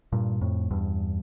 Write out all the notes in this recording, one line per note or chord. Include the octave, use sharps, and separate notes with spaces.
G2 A#2
F2 A2
E2 G2